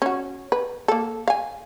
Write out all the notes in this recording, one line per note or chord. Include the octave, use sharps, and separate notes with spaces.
C#4 F#4
B4
A#3 A4
F5 G#5